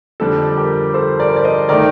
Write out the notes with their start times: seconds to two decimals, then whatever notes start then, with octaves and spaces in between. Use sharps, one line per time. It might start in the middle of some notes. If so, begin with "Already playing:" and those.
0.20 F2 D3 G3 D4 A4
0.57 G4 A#4
0.94 A4 C5
1.19 A#4 D5
1.29 C5
1.36 D5
1.44 C5 D#5
1.69 D#3 A3 D#4 A#4 D5